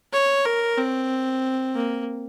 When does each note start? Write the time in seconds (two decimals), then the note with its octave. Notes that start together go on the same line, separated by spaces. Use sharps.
0.13 C#5
0.45 A#4
0.78 C4
1.74 A#3